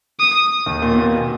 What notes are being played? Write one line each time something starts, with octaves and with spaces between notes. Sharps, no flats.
D#6
D#2 D#3
A#2 A#3
B3
A#2 A#3
B2 B3